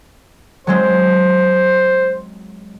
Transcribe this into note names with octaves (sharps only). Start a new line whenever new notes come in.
F#3 G#3 C4 C5